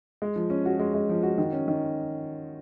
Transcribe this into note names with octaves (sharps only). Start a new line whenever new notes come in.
G#3
F3
C#4
F#4
G#3
G#3
F3
F#4
D#3
C#4
D#3